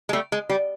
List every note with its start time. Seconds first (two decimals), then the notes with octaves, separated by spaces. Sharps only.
0.09 G#3
0.13 G3 A3
0.32 G#3
0.50 G3